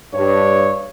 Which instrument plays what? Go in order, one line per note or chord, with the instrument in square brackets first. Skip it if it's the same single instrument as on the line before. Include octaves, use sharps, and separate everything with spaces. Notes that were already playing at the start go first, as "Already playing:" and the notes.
[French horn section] G2 [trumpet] C#5